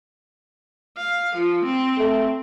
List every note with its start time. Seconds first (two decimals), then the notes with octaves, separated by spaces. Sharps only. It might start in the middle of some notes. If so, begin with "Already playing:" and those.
0.98 F5
1.36 F3
1.65 C4
1.98 A3